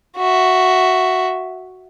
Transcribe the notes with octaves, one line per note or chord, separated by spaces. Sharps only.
F#4 E5